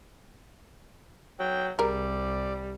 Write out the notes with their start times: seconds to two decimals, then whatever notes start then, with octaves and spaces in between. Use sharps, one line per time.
1.40 F#3 G5
1.79 C2 G3 G#4 A#4 D5